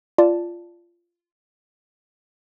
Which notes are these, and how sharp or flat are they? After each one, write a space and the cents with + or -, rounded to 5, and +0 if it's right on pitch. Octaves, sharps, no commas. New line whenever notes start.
F4 -15 D5 +0 A5 +0